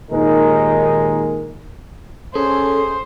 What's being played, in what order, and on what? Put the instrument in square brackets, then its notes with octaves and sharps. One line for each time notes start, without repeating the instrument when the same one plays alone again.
[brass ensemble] D#2 A#2 D#3 G#3 D#4 A#4
[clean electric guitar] C#4 [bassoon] G#4 [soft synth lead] A4 [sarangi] C5